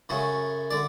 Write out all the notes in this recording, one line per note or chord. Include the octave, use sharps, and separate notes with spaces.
F#2 C#3 F#3 A3
D3 D5